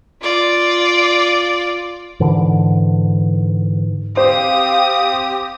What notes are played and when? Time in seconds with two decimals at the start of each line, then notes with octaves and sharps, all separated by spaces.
0.23 F4 D5
2.20 G#2 D3 E3
4.17 C4 G4 C5 F5 D#6